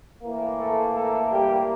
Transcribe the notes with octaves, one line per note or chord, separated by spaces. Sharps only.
A2 E3 A#3
A3 A4
A3 A4
G3 G4